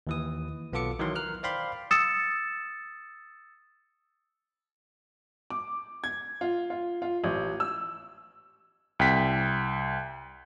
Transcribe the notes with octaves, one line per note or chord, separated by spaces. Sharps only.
D#2 E3 D#6
B1 B3 F4 A4 D6 C#7
D#3 E3 F#3 C6
A#4 F6 F#6
C5 D5 F5 G5 B5 C6
D#6 E6 A6 C#7 E7
D6
G#6
F4
F4
F4
A1
E6
C2 G5 B6